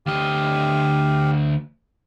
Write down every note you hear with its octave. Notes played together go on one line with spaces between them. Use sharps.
D2 G4 D#5 F5